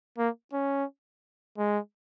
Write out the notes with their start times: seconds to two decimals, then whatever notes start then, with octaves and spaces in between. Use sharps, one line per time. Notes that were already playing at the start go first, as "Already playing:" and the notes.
0.18 A#3
0.53 C#4
1.58 G#3